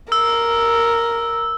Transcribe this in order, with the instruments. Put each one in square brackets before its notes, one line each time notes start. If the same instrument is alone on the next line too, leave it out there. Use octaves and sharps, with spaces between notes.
[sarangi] A#4 [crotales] E6